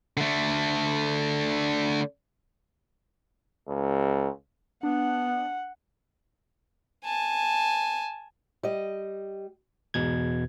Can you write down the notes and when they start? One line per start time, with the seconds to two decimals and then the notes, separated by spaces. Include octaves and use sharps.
0.17 D3 A3
3.68 C#2
4.83 B3 D4 F#5
7.05 G#5 A5
8.63 G3 D#5
9.94 E2 G#2 B2 G#6